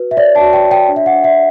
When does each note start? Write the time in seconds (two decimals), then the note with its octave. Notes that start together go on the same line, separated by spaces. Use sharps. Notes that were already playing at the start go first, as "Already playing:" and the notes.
Already playing: F#4 B4
0.11 E5
0.17 C#5 D5
0.35 A5
0.41 F#4
0.53 G5
0.65 C#5
0.71 G5
0.89 D4
0.96 E5
1.06 F#5
1.12 D4
1.24 E5